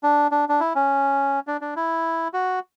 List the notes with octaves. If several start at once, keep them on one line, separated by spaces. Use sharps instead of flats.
D4
D4
D4
E4
C#4
D4
D4
E4
F#4